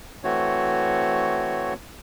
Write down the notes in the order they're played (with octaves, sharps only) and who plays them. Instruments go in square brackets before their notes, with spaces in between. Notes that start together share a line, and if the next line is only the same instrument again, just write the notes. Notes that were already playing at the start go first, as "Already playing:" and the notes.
[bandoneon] E3 A3 C4 F#4 C#5